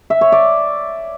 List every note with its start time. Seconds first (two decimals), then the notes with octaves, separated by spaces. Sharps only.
0.10 E5
0.21 C#5
0.32 D5